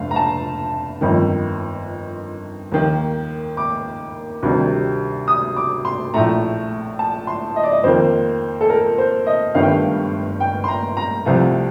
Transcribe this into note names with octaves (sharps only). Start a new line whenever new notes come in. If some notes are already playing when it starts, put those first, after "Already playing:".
Already playing: F1 D3 A3 F5
A#5
A5
G1 F2 D#3
D#2 D#3 A#3
D6
D2 C3 D#3 G3
D#6
D6
C6
A#1 A2 A3 A#5
A5
C6
D#5
D5
D#5
F2 D#3 A#3 C5
A4
A#4
C5
D#5
G1 G2 D#3 A3 F5
G5
F5
G5
C6
A#5
A#5
C2 C3 F3 A3 F5